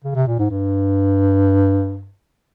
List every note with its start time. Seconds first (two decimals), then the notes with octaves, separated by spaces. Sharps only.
0.04 C#3
0.15 C3
0.27 A#2
0.39 G#2
0.50 G2